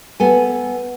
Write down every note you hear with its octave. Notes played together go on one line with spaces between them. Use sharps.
B3 A4 G#5